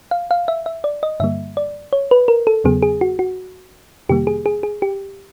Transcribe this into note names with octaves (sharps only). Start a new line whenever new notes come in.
F5
F5
E5
E5
D5
D#5
G2 D3 G3 A#3 E5
D5
C#5
B4
A#4
A4
E2 C#3 F#3 B3 G#4
G#4
F#4
F#4
F2 C3 D#3 G3 A#3 G4
G#4
G#4
G#4
G4